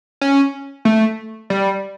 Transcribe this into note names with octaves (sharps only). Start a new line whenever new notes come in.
C#4
A3
G3